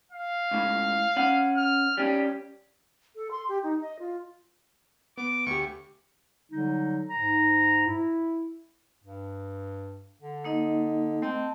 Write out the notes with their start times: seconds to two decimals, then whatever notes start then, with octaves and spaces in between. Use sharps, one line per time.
0.12 F5
0.51 C#2 A2
1.16 C#4 F#5
1.57 F6
1.97 G3 C#4 G4
3.16 A4
3.31 C6
3.48 G4
3.63 D#4
3.81 D#5
3.99 F4
5.17 B3 D6
5.46 D2 G4 C#6
6.52 D3 F#3 G3 D#4
7.10 G#2 A#5
7.87 E4
9.04 G2
10.22 D3
10.45 A#3 D#4 D#5
11.22 A3 C4 D#5 A5